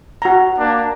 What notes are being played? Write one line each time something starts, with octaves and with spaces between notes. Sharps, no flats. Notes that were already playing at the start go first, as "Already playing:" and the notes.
F#4 A#5
A#3 D4